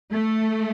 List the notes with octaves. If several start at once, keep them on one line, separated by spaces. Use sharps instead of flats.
A3